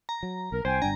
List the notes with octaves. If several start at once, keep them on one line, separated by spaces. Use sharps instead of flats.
A#5
F#3
B1 A#4
C2 C5 G5 G#5
G1 G2 D4 A#5